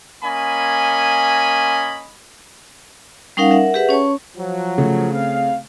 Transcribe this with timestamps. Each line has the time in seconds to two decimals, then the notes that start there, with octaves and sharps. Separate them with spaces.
0.23 A#3 C#4 D#5 G#5 B5
3.37 G3 C#4 D#4 A#4 F5 F#5
3.51 A#4 E5 F#5
3.74 G4 G#4 B4 E5 F#5
3.89 C#4 C#5 A5 C#6
4.36 F3 F#3
4.78 C#3 A3
5.13 C4 F5